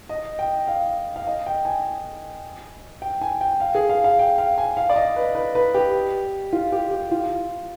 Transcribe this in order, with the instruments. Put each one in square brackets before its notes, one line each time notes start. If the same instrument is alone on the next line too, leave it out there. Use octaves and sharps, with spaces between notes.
[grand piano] D#5
G5
F5
F5
D#5
G5
G#5
G5
G#5
G5
F5
G#4
F5
F5
G5
F5
G#5
F5
D5
D#5
B4
B4
B4
G4
F4
G4
G4
F4